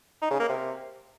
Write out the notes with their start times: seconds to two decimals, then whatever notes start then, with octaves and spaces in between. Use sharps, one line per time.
0.22 D#4
0.31 C#3
0.40 A#3
0.49 C3